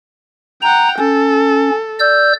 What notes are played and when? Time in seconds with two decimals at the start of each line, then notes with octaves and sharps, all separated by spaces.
0.62 F#5 G5 A#5
0.99 C#4 A4
1.99 D5 E6 G6